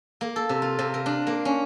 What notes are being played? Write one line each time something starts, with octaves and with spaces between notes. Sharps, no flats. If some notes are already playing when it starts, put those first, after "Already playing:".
A#3
A4
C3
F4
C3
A#4
D4
A#3
C#4